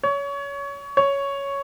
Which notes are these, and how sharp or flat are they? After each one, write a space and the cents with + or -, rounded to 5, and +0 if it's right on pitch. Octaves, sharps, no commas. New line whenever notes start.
C#5 +25
C#5 +5